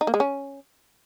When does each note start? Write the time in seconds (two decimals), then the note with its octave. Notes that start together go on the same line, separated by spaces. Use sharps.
0.01 D#4
0.07 A#3
0.14 G#3
0.20 C#4